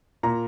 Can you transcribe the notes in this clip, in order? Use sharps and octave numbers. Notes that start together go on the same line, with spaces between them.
A#2 A#5